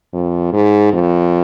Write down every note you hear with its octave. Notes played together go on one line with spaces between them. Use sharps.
F2
G#2
F2